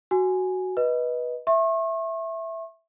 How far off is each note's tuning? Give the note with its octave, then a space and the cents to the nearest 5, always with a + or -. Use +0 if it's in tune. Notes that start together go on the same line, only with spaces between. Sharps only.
F#4 +5 G#5 +0
B4 -15 D#5 +10
E5 +0 C#6 -40